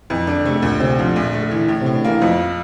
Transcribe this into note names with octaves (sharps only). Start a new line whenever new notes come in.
F2 E3
D3 D4
C3 A3
C3
D2 A#2
C3 C4
D3 F3
A#1
A3
E3
A2
A2 C3
D3
E3 A#3
F2 F3